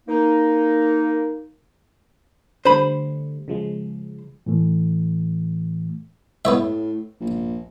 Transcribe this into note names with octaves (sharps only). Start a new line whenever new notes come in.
A#3 D#4
D3 G3 A3 C5 B5
C#3 F3 G#3
A2 E3 A3
A2 B3 C#5 E5
A#1